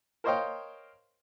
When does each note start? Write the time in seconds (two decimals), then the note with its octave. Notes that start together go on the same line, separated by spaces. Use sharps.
0.24 A#4 C5 C#5 D#5 F5 G5